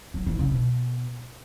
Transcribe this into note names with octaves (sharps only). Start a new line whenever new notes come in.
F#3
E3
C#3
B2